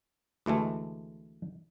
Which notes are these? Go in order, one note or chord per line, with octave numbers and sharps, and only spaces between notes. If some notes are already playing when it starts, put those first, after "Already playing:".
D2 E3 G#3 A3